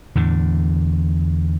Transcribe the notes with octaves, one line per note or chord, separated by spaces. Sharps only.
E2 A2 D3